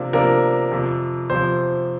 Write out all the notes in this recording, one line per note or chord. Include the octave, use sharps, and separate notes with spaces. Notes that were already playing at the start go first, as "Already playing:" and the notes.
Already playing: C3 F3 A#3 D4
C3 F3 A#3 D4 A#4
F2 C3 F3
F2 C3 F3 C5